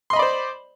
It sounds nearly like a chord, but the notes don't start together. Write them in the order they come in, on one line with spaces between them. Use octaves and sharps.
C6 D#5 B5 D5 C5